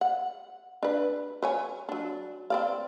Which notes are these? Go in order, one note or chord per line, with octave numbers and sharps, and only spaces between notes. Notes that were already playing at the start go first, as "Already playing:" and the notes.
F#5
D4 B4
B4 C#5 G#5
F#3 D4
C4 D5 F5